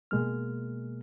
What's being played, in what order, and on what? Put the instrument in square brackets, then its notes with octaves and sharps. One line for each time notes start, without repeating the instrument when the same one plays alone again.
[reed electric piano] B2 G#3 A#3 F6